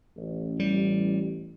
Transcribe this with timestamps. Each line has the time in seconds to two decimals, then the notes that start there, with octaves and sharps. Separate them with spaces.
0.17 A1
0.60 G3